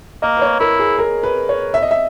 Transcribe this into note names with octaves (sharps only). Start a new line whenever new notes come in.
A#3 D#5
B4
C#5
E4 A#4
G#4
A#4
B4
C#5
E5
D#5
E5